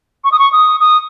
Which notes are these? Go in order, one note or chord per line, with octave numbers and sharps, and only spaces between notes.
C#6
D#6
C#6
D#6
D#6